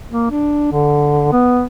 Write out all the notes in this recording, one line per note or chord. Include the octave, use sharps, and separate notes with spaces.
A#3
D4
D3
B3